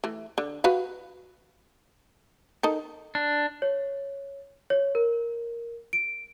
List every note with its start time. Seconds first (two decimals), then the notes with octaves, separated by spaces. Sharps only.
0.04 E3 A3
0.38 D3
0.64 F#4 B4 F5
2.63 D#4 A4 A#4
3.15 D4
3.62 C#5
4.70 C#5
4.95 A#4
5.93 D7